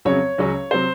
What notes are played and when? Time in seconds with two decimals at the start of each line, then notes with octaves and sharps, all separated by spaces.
0.05 F2 C#3 F#3 C#5
0.38 C#2 C#3 F#3 C#4
0.71 C3 F#3 C5